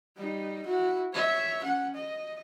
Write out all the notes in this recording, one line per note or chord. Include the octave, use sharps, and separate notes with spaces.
G3 D#4
E4 F#4
C#5 E5
C#4 F#5
D#5